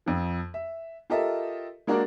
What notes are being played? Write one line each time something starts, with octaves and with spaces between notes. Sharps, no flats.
F2 F3
E5
F4 G4 A4 A#4 D#5 E5
G#3 A#3 D4 F#4 A#4 D5